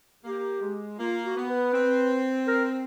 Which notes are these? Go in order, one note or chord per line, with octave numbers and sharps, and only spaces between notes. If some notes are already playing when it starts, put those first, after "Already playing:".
A#3 G4
G#3
A#3 F4
F#4
B3
B4
C4
A#4